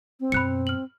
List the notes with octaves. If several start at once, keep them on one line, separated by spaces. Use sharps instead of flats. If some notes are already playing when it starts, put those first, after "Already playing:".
C4
F#2 B2 B5 F#6 C#7
F6 F#7